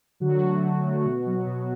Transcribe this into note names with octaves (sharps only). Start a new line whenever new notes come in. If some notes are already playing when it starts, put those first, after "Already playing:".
D3 F#3 F#4
F#3 A3
D3
F#3 A3
B2
F#3 B3
B2